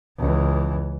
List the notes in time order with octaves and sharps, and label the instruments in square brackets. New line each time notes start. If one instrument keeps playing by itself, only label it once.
[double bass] C#2 E3